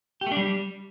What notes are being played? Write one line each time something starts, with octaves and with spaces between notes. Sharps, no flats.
G4
A3
D4
G3